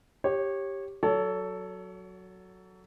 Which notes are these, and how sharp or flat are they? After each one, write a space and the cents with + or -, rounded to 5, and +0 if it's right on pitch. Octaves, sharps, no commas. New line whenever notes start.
G4 +0 C#5 -20
F#3 +0 A4 +0 C#5 +35